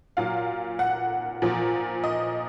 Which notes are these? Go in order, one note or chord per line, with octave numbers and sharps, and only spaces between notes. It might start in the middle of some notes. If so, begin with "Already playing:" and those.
A#2 F#3 F5
F#5
A#2 F3
D#5